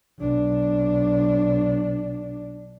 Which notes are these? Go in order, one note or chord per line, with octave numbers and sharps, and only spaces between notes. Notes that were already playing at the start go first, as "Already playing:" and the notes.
B1 D4